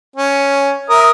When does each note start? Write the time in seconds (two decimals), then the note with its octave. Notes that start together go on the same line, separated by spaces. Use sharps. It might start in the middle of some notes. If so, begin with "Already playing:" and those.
0.16 C#4
0.90 A#4 E5 D#6